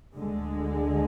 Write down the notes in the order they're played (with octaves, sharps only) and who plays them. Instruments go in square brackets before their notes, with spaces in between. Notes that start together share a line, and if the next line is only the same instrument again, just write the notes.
[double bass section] D2 D3 G#3